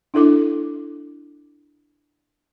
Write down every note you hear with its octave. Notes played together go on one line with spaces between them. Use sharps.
D4 E4 A4 D6